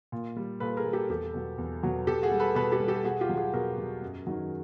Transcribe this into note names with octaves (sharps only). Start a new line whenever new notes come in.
A#2
G3
A#2 A4 B4
G#4 A#4
G3
G4 A4
E2 G4 A4
B2 F#3
E2
B2 F#3
B2 G4 A4
F#4 G#4
G3
A4 B4
B2 A4 B4
G4 A4
G3
G4 A4
B2 F#4 G#4
F4 G4
F#3
F#4 G#4
B2 G#4 A#4
F#3
F#2
D#3 F#3